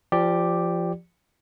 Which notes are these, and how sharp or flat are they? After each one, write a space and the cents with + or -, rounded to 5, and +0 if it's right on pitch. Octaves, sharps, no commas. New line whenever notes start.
F3 -20 G4 +0 D5 +0